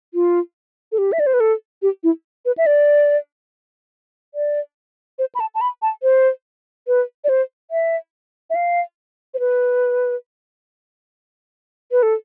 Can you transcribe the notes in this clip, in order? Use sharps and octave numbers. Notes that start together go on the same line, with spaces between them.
F4
A4
G4
E5
D5
C5
B4
A4
G4
E4
B4
E5
D5
D5
C5
B5
A5
A5
B5
A5
C5
B4
D5
C5
E5
E5
F5
C5
B4
B4
A4